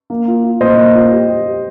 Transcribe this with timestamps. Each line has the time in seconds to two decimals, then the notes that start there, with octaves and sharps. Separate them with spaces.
0.10 A#3
0.28 F4
0.44 F4
0.61 A#2 C5 D#5
0.77 A#3
0.95 F4
1.11 G4
1.28 G4
1.45 G4